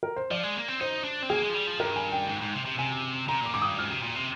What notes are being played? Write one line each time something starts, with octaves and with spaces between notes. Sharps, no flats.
A#4
C5
F3 D5
G#3
A#3
C4
D#4 C5
D4
C4
A#3 G#4
G#3
F3
G3
F3
G2 A#4
G#5
G5
G#2
G#2
C3
C3
C3 G#5
C3 A#5
A#2 D6
G#2 D6
G2 D#6
G#2 F6
C3
A#2
C3